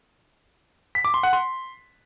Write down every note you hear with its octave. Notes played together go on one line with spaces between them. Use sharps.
B6
D6
C6
F#5
C6